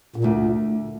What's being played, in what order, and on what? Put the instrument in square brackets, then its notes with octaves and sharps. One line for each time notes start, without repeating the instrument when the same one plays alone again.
[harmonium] A#2
[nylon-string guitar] D2 [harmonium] A2